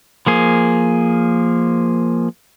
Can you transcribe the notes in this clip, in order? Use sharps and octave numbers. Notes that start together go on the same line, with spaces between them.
F3 A#3 G#4